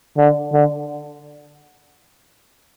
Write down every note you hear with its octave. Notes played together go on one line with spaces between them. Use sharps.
D3
D3